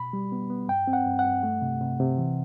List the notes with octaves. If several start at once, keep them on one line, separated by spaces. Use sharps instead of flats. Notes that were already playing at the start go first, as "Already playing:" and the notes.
Already playing: B2 B5
G3
B3
B3
G2 G5
C4
F#5
G2
F#5
G2
A3
C3
C3
C3
E3